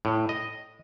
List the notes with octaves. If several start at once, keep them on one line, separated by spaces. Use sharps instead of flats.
A2
D#5